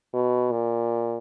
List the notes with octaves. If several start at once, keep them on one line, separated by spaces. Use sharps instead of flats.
B2
A#2